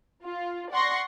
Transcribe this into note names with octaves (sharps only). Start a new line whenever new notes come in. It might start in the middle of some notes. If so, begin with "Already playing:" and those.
F4
D5 F#5 C6 C#6 A#6